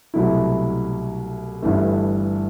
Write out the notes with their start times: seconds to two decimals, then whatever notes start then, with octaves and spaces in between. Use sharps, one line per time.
0.14 C2 B2 F#3 A3 E4
1.62 G1 G2 E3 A3